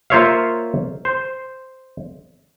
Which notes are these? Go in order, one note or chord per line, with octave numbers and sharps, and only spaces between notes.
A#3 F4 C5 C#5 E5 F5
C5